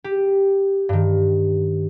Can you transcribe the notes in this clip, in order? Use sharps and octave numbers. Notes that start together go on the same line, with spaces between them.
G4
G2 D#3